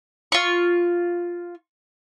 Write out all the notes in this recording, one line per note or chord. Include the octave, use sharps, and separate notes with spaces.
F4 C#6